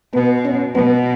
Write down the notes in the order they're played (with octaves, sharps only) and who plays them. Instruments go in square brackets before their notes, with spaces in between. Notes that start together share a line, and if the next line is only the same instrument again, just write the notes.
[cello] B2 [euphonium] B3
[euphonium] C#4
[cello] B2 [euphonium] B3